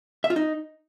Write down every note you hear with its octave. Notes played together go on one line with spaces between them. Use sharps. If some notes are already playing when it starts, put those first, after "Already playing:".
E5
F4
D#4